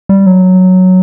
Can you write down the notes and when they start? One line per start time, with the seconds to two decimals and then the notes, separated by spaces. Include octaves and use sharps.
0.09 G3
0.26 F#3